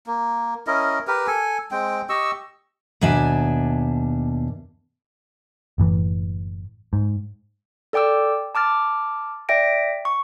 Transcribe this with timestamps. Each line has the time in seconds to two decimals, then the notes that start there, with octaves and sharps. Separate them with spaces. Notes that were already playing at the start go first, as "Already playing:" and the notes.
0.07 A#3
0.67 C#4 E4 A#4 D#5
1.07 G4 A#4 B4
1.27 A4 G#5
1.71 G#3 C4 G5
2.09 G4 D#5 C#6 E6
3.01 D#2 B2 D4 E5 G#5
5.78 F#1 A2 E3
6.93 G#2
7.93 A4 D5 G5 D6 E6
8.55 A5 D6 F6 A6
9.49 D5 E5 G5 A#6 D7
10.05 C#6